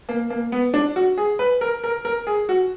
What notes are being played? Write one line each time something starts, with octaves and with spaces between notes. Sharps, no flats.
A#3
A#3
B3
D4
F#4
G#4
B4
A#4
A#4
A#4
G#4
F#4